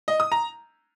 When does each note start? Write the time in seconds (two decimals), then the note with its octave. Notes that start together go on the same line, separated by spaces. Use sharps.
0.08 D#5
0.20 D#6
0.32 A#5